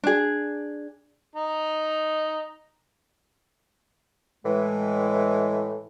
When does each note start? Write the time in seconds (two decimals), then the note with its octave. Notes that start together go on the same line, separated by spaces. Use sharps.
0.04 D4 G#4
1.36 D#4 A#5
4.44 A2 E3 G#3